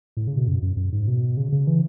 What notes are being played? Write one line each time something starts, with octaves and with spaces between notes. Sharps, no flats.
A2
C#3
B2
F#2
F#2
F#2
G#2
B2
C#3
C#3
E3